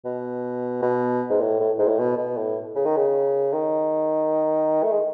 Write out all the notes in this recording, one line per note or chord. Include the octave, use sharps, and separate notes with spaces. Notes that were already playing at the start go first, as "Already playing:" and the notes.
B2
B2
G#2
A2
A2
G#2
A2
B2
B2
A2
C#3
D#3
C#3
D#3
A3
G#3